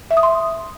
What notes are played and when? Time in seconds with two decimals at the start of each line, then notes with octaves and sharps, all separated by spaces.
0.11 E5
0.17 D#6
0.23 C6